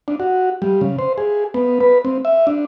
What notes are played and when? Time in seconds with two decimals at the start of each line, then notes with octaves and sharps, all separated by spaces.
0.08 D4
0.20 F#4
0.62 G3
0.81 C#3
0.99 C5
1.18 G#4
1.54 B3
1.80 B4
2.05 C4
2.25 E5
2.47 D4